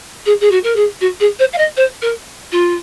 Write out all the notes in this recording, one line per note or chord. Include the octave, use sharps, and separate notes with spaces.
G#4
G#4
F#4
A#4
G#4
F#4
G#4
C5
F5
D#5
C5
A#4
F4